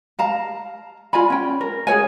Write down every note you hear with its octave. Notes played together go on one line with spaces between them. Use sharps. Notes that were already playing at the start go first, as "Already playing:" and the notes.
F5 A5 A#5
F4 D5 G#5 B5
C#4 G5
A#4
G#4 A4 C#5 G#5